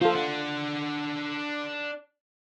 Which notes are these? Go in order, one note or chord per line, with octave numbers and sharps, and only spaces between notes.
F3 F4 A4 C5
D4 F#5